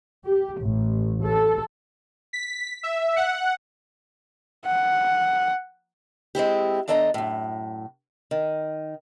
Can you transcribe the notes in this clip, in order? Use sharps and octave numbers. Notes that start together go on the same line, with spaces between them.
G4
A1
A4
B6
E5
F#5
F#5
G#3 C4 E4 G4
E2 D4 A4 D#5 G#5 A#5
F#2 A2
D#3